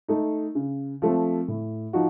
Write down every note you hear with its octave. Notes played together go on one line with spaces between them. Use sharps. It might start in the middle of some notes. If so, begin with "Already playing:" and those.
A3 D#4
C#3
F3 A3 C4
A2
F3 D#4 F#4